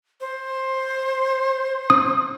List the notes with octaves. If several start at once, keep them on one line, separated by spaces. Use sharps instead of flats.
C5
D#6